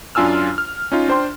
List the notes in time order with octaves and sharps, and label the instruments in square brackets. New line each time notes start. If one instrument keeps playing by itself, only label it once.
[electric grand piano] F#2 D4 F4 G#5 E6 F6
F6
C#4 D#4 F4
D4 C5 G5 C6